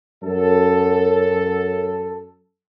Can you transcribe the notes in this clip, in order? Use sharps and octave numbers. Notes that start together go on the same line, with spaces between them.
F#2 A4